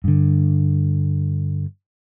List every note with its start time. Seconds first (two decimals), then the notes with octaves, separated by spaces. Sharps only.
0.04 G2 D3